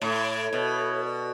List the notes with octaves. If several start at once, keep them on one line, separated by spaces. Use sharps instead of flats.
A2 E4 A4 C#5
B2
F#4 A4 D5